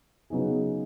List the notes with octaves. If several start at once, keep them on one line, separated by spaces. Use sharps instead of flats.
C#3 F#3 B3 D#4 G#4